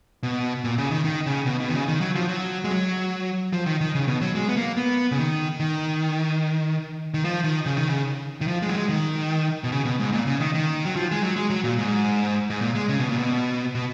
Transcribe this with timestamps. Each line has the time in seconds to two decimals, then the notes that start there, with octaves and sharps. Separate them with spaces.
0.23 B2
0.64 A#2
0.78 C#3
0.91 D#3
1.05 D#3
1.26 C#3
1.46 B2
1.60 B2
1.69 D#3
1.74 C#3
1.88 D#3
2.01 F#3
2.15 F3
2.28 F#3
2.64 G#3
2.71 F#3
3.53 F3
3.66 D#3
3.81 D#3
3.95 C#3
4.08 B2
4.21 F#3
4.35 G#3
4.49 B3
4.57 A#3
4.77 B3
5.12 C#3
5.18 D#3
5.60 D#3
7.14 D#3
7.25 F3
7.44 D#3
7.66 C#3
7.77 D#3
7.87 C#3
8.41 D#3
8.48 F3
8.62 G#3
8.69 F#3
8.75 G#3
8.89 D#3
9.64 B2
9.72 C#3
9.85 B2
10.00 G#2
10.13 A#2
10.27 C#3
10.40 D#3
10.55 D#3
10.85 F#3
10.96 F3
11.12 G#3
11.23 F#3
11.36 G#3
11.50 F#3
11.64 A#2
11.78 G#2
12.50 G#2
12.61 A#2
12.75 G#3
12.89 C#3
12.99 B2
13.09 A#2
13.18 B2
13.75 B2